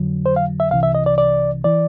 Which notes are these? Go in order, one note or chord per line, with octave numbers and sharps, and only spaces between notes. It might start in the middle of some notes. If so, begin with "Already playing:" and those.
Already playing: F2 D3 F#3
C5
F5
E5
C2 C3 E3 F5
E5
D#5
D5
D5
E3 D5